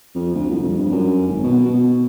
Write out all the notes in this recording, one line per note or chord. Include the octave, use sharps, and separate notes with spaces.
F2
D2
C2
F2
G2
F#2
G#1
B2
B2